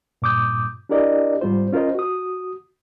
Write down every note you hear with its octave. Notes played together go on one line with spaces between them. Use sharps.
G2 A#2 D6 D#6 G6
D4 E4 G4 A#4 D5 D#5
G#2 G3 C4 F4 C5
C#4 F4 A#4 C5 D#5
F#4 D#6